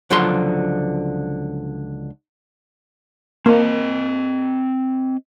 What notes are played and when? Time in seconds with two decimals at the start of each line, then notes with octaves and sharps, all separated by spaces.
0.10 C#2 D3 F3 F#3 C6
3.46 A#3 C4 D#5